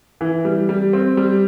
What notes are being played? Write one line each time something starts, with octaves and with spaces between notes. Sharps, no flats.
E3
G3
G3
C4
G3